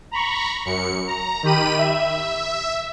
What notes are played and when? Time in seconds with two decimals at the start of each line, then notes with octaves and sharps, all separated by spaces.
0.11 A#5 B5 C#6
0.65 F#2 C#7
1.07 A#5
1.43 D#3 G4 B5 D#7
1.78 E5